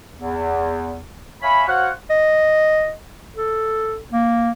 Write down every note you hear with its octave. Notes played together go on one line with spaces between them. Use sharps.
E2
C#5 E5 F5 G#5 B5
F#4 C5 C#5 F5 F#5
D#5
A4
A#3